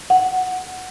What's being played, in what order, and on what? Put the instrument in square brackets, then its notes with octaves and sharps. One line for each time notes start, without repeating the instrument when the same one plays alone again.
[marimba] F#5